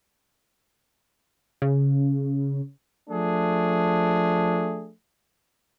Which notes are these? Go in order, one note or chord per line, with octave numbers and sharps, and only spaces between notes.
C#3
F3 A3 D4 G#4